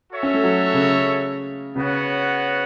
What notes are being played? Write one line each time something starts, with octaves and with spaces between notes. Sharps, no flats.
F#4 A4 C#5 E5
C#4
A3
F#3
C#3
C#3 B3 F#4 C#5 F#5